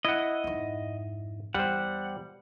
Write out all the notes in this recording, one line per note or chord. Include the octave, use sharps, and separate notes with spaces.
E4 D#5 F#5
F2 G#2
E2 G3 C5 F#5